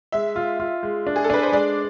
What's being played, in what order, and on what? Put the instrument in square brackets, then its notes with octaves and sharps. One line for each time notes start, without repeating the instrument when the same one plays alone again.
[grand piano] G#3 [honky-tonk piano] E5
[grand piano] F4
F4
G#3
D4
[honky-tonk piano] G#4
A4
[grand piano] D4 [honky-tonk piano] B4
[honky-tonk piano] C5
[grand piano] G#3 [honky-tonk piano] D5